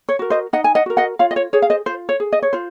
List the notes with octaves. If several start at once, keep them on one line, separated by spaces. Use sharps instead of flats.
C#5
F#4 A#4
C5 D#5
D#4 D#5 F#5
G#5
D#5 F#5
F#4 A#4
D#5 F#5
F4 C#5 F5
D#5
C#5
G#4 C#5
F5
C5 D#5
F4 C5
C#5
G#4
D#5
C#5
F4 C5